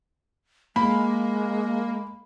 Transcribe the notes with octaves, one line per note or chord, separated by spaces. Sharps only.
G#3 A#3 B5